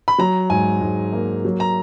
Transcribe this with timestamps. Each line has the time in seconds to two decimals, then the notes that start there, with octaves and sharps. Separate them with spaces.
0.08 B5
0.18 F#3 A#5
0.50 G#2 G#5
0.81 G#2
1.13 A#3
1.45 F#3
1.60 A#5